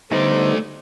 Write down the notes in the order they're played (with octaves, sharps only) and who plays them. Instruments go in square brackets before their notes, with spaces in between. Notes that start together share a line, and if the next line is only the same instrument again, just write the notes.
[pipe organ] D3 [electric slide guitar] G3 B3 D#4 [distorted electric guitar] A3 D5 [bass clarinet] C5